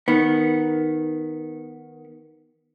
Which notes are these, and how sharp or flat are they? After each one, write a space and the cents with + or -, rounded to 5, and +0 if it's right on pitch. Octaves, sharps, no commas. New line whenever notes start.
D#3 +5 B3 +0